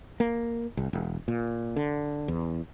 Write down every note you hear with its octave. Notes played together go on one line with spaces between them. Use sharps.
A#3
C2
E1
A#2
D3
E2